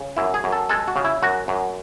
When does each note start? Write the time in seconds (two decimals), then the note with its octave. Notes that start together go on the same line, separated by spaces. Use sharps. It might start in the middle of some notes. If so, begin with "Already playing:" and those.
Already playing: C#3
0.17 F#2 E4
0.34 G#4
0.44 F#2
0.52 A4
0.69 G#3 A4
0.88 F#4
0.96 C#3
1.05 E4
1.22 F#2 F#4
1.48 F#2